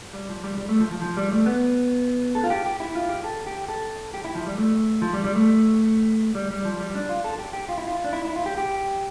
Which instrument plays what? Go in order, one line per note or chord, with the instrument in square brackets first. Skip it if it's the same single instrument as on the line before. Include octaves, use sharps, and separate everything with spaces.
[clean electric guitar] G3
F3
G3
G3
A3
F3
F3
F3
G3
A3
B3
A4
F4
G4
G4
E4
F4
G4
A4
G4
A4
G4
E4
F3
G3
A3
F3
G3
G3
A3
G3
G3
F3
G3
D4
F4
A4
G4
G4
F4
E4
F4
D4
E4
E4
F4
G4
G4